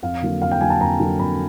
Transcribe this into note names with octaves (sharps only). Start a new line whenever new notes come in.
F2 F5
D3 F#3 A#3
F2 F5
G5
D3 F#3 A#3 G#5
A5
F2 A#5
D3 F#3 A#3
F2 B5